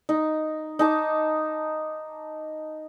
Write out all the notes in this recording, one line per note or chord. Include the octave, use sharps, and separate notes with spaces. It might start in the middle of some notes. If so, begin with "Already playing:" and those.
D#4
D#4 A5 D6